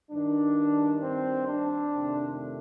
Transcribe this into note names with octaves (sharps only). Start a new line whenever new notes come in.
G2 D#3 G3 D4
C4
D4
F2 C3 D#3 A3 C4